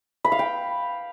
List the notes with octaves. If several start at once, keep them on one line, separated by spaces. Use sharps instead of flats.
B5
F5
G5